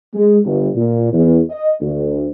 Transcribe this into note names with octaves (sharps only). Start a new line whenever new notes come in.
G#3
G1
A#2
E2
D#5
D2